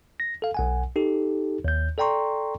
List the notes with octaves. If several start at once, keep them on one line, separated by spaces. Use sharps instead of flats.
A#6
A4 F5
B1 F#5 G#5
D#4 G4 A4
D#2 G6
A4 D5 G5 A#5 C6 C#6